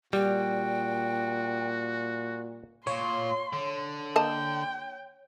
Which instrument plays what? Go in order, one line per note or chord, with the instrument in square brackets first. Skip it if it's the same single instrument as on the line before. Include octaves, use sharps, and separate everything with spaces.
[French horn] A#2 [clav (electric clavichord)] G3 [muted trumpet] F#4 [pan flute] G5
[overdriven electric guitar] A#2 [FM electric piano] C#5 [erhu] C6
[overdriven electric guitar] D3
[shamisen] A#3 D#5 A5 [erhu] G5